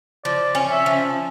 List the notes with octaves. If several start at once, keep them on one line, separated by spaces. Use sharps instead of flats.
F3 D5
C#4
E5
F3